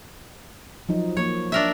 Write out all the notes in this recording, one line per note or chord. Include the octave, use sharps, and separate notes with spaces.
F3 F#3 D#4
F3 A#3 C#5
D4 A#4 E5